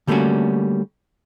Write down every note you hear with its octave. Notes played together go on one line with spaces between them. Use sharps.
D3 G3 A3 A#3 C#4 F#4